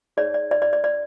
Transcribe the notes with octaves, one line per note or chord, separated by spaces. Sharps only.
D#4 G#4 C#5 D5
D5
D5
D5
D5
D5